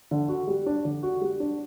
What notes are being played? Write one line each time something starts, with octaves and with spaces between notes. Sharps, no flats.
D3
F#4
G3
D4
D3
F#4
G3
D4